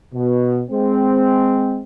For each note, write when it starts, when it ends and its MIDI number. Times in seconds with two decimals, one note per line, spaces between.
0.13 0.62 47
0.70 1.81 56
0.70 1.81 60